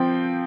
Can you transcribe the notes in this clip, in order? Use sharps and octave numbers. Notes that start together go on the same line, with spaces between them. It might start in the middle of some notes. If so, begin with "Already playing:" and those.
Already playing: F3 C4 G5